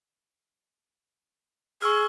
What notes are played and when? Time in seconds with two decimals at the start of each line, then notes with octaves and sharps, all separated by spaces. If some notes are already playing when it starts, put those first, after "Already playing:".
1.82 G#4 C#6 E6 F6